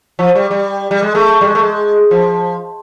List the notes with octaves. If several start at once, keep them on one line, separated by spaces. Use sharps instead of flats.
F3
G3
G3
G3
G#3
A3
G3
G#3
A3
G#3
F3